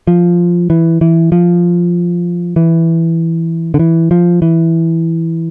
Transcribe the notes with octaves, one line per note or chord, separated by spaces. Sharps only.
F3
E3
E3
F3
E3
D3
E3
F3
E3